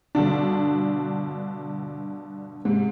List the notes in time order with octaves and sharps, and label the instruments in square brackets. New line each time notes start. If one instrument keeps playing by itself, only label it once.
[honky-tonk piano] G2 B2 D3 D4
G#2 C3